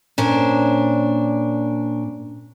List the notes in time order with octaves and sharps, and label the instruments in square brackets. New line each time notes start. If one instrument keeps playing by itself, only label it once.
[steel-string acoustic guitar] A#2 C#4 D4 C5